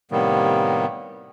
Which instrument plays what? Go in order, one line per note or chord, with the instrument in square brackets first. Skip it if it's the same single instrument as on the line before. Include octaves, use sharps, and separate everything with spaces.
[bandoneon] A2 C3 D#3 G3 A#3 B3